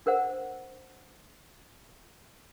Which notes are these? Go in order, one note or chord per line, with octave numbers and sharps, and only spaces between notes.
D4 A#4 C5 F#5